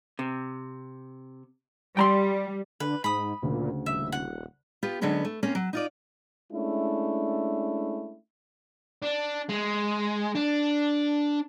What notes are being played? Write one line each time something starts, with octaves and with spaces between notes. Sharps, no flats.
C3
G3 G5 A#5 C6
D3 B4
G#2 B5 D#6
D2 A#2 C#3
D#1 E5
F#5
B3 F4 G4
D3 F#3 G#3 B3 C#4
A3
A#3 C4 C#4
F#3
D#4 F4 D5
G#3 A3 C#4 D4 E4
D4
G#3
D4